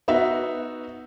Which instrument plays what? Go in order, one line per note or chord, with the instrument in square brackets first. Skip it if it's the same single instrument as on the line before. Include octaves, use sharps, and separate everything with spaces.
[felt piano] B3 D#4 F#4 E5